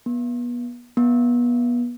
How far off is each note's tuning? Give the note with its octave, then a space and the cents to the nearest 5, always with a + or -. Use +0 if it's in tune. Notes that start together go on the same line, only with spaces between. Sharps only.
B3 -30
B3 -30